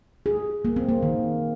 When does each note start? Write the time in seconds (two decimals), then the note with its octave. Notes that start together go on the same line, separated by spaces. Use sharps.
0.26 G#4
0.65 A#3
0.76 C4
0.89 A#3
1.03 D#3